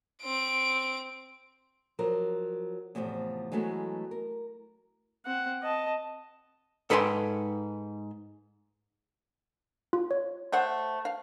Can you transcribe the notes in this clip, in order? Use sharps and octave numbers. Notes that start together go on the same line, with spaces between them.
C4 D7
F3 F#3 A#4
E2 A2 C3 E3 F3
E3 F#3 G#3 A3 B3
A#4
C4 F#5
D#5 A5
G#2 A4 B4 G5 G#5 C6
F4
C#5
A3 C5 F#5
F5